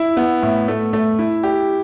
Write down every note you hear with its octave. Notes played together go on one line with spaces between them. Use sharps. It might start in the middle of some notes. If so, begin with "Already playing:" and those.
Already playing: E4
B3
A2
A3
A3
E4
G4